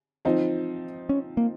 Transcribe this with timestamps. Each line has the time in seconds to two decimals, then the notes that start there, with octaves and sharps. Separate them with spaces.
0.25 F3 C4 D#4
1.09 C#4
1.37 A#3